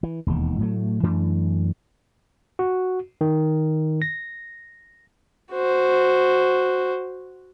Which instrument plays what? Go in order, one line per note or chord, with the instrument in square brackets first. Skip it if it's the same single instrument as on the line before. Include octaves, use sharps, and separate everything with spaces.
[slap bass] E3
E1 D#2 D#3
A2 F#3 A3
F#2 E3 A3 D4
[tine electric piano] F#4
D#3
A#6
[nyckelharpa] F#4 C5